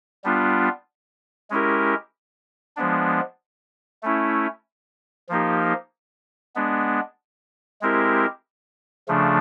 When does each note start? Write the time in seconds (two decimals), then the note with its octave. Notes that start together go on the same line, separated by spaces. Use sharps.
0.24 G3 B3 D4 F4
1.50 G#3 C#4 E4 G4 A#4
2.77 F3 G#3 B3 D4
4.03 A3 C#4 E4
5.29 F3 A#3 D#4 G4
6.55 G#3 B3 D4
7.81 G#3 C4 E4 G4 A#4
9.08 C#3 F3 A3 D4